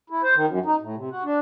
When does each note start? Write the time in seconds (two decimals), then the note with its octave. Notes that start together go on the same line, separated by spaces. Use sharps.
0.10 E4
0.23 C5
0.35 D#3
0.48 F#2
0.66 D#4
0.81 A2
0.96 C3
1.11 F#4
1.24 D4